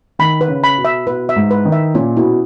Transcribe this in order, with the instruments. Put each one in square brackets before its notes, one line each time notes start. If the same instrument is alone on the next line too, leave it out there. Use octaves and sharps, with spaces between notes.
[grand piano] D#3 [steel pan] B5
[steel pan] B4
[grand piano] C#3
[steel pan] B5
[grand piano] B2
[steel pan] E5
[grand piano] B2 [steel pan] B4
[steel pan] E5
[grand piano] G#2
[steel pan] B4
[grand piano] D#3
[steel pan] E5
[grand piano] A#2 [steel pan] C#4
[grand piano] B2 [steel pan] E4